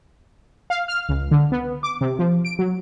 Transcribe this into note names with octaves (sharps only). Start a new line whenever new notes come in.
F5
F6
C#2
D3
B3
D6
C3
F3
D7
F#3